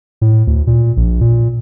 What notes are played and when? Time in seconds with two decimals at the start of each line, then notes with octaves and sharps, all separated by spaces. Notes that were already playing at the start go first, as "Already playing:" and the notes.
0.21 A2
0.47 D2
0.67 A#2
0.97 A#1
1.21 A#2